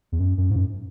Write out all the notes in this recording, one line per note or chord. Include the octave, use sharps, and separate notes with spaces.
E2
F#2
F#2
G#2
F#2